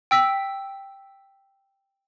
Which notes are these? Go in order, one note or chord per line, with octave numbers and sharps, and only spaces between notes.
G5 E6 B6